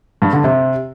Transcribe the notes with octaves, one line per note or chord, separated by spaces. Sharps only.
G2
D3
C3